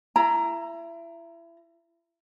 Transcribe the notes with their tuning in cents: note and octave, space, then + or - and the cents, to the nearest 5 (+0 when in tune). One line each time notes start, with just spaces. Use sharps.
E4 +30 A#5 +0